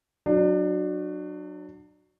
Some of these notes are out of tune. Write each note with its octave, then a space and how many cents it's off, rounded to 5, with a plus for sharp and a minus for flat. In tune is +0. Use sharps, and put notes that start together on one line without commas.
F#3 +0 D4 +30